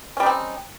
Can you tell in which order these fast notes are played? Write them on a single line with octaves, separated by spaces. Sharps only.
C#4 G3 D#4 C4